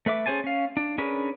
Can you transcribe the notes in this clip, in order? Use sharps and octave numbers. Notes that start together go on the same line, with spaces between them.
A3 B4 E5 D6
C#4 G#4 C5 G#5 A5
C#4 F5
D4
C#4 D4 G#4 A#4 B4